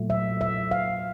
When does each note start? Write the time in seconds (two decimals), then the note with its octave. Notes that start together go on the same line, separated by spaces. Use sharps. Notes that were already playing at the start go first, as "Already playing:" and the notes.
Already playing: A#2 F#3 A3
0.10 E5
0.41 E5
0.71 F5